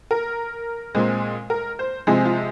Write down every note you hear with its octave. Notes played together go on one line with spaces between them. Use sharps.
A#4
A#2 G#3 C4
A#4
C5
C3 F3 G#3 C4 G#4
F4